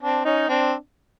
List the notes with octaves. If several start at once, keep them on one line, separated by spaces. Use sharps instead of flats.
C4 D4
C#4 D#4
C4 D4